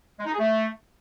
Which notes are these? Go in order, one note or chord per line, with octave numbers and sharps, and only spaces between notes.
G#3
D#4
G#4
A3